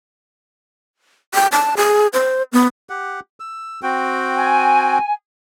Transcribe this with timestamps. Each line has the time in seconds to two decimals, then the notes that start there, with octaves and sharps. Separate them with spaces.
1.34 G5
1.52 A5
1.77 G#4
2.13 C5
2.53 B3
2.90 G4 F#5
3.40 E6
3.83 C4 F#4 G5
4.36 G#5